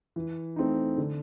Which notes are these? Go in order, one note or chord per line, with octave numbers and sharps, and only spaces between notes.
E3
A3 C4 D#4
D3